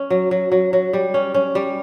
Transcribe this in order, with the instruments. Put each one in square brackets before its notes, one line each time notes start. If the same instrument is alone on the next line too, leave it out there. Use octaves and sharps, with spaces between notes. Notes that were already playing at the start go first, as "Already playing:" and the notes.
Already playing: [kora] C#4
F#3
F#3
F#3
F#3
G3
C#4
C#4
G3